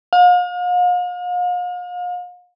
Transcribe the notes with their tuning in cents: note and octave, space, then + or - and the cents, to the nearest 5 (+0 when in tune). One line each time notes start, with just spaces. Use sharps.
F5 +40